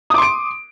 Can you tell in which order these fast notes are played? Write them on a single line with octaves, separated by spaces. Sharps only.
D#6 D6 C6 D7